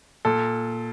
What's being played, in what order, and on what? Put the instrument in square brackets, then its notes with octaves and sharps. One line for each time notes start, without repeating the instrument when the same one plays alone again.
[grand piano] A#2 A4